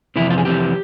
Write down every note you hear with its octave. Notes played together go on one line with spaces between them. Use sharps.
F2 C3 E3 E4
F4
G#4
F2 C3 E3 G4